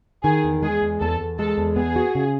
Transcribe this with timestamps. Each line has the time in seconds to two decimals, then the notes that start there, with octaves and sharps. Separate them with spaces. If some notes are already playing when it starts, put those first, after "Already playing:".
0.24 D#3 G#4
0.44 E2
0.63 G#3 G#4
0.82 E2
1.01 E2 A4
1.20 E2
1.39 G#3 A4
1.58 E2
1.76 B3 G#4
1.96 F#4
2.15 C#3